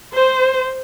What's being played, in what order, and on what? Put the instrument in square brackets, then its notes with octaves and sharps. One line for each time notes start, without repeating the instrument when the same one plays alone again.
[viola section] C5